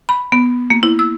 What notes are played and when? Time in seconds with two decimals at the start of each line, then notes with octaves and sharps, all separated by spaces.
0.09 B5
0.32 B3
0.70 A#3
0.83 E4
0.99 E6